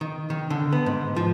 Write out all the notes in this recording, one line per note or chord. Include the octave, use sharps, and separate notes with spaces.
D#3
D#3
D3
B3
G#2
F3